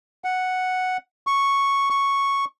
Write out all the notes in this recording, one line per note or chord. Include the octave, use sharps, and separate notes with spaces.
F#5
C#6
C#6